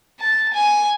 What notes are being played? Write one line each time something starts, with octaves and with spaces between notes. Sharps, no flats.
A5
G#5